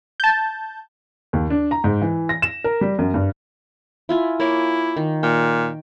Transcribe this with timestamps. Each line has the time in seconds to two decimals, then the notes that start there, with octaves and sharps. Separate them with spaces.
0.20 A5 G6
1.33 D#2
1.50 D4
1.71 A#5
1.84 G#2
2.02 E3
2.29 A#6
2.42 E7
2.64 A#4
2.81 G3
2.99 F#2
3.14 G2
4.09 E4 F4 G#5
4.40 A#3 E4 C#5 G#5
4.97 D#3
5.23 A#2 G5